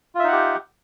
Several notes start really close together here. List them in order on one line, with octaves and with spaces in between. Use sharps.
F4 E5 D#4 F#5 G4